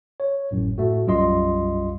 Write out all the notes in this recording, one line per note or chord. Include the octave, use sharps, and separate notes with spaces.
C#5
G#1 F#2 A2
A2 A3 F#4
B1 F#2 G3 F4 D#5 C6